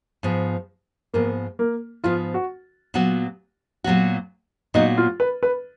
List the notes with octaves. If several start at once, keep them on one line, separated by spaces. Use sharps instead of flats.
G#2 F3 B3
G#2 F3 A#3 B3
A#3
G#2 F3 B3 F4
F#4
A#2 F#3 B3 F#4
A#2 F#3 B3 F#4
A#2 F#3 B3 D#4 F#4
F4
B4
B4